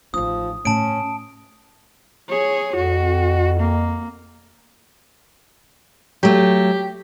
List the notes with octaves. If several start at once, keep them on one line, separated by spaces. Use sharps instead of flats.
A1 F3 D#4 D#6
A2 C#4 A5 D7
G#4 C#5
F2 F#4
A#3
F#3 A3 G4